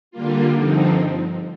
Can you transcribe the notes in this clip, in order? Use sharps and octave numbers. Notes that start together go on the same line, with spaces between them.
D3 G3 A#3 F4
G2 D3 F3 C4 D#4